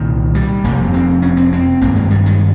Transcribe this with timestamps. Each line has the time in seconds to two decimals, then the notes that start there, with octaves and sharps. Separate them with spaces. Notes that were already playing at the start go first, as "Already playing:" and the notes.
Already playing: C2 A#2 D#3
0.35 G3
0.64 F1 F2 C3 A#3
0.94 C4
1.22 C#4
1.37 C4
1.53 C4
1.81 G#1 G2 A#3
1.95 G#3
2.11 G3
2.26 D#3